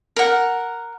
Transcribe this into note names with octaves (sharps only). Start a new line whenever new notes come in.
A#4 F#5